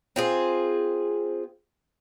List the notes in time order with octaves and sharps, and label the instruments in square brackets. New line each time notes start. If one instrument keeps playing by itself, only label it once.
[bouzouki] C4 F4 G#4